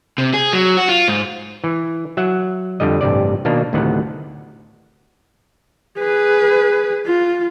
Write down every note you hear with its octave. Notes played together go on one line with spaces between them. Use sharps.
C3
G#4
F#3
F#4
F4
G#2
E3
F#3 E5 F#5
F2 D3 G3 D#5
A1 G2 C3 D5
B2 D#3 A#3 D4
D2 A2 C3 D#3 B3 F#5
G#4 B4
F4